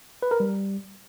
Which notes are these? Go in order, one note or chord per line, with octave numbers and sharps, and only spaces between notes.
B4
A#4
G3